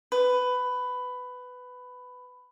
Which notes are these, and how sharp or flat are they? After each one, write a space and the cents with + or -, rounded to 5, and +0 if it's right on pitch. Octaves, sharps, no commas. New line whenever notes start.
B4 +15